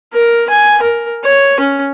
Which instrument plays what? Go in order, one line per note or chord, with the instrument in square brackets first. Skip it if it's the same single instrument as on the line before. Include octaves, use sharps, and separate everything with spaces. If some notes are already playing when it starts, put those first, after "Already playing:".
[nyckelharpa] A#4
G#5
A#4
C#5
C#4